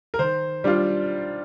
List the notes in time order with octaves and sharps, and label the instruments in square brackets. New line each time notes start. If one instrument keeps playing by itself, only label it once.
[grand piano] A#4
D#3 C5
G3 D4 F4